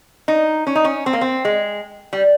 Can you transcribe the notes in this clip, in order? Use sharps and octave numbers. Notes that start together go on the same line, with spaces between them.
D#4
C#4
D#4
C#4
C4
A#3
C4
G#3
G3